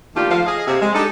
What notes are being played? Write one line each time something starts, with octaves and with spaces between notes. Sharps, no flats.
D#3 A3 A#3 D4 F4 G4
F3 A3 A4 C5 F5
G#4 D#5 F5
C3 A#3 G4 C5 E5
G#3
D4 D#4 G4 A4